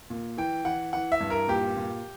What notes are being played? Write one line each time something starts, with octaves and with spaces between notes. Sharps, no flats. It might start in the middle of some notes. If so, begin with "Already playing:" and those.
A#2
E3 G5
E3 F#5
E3 F#5
E5
G2
A#4
A#2 G4
A#2